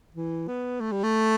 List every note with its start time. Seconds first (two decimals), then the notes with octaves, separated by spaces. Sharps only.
0.15 E3
0.48 B3
0.80 A3
0.92 G3
1.03 A3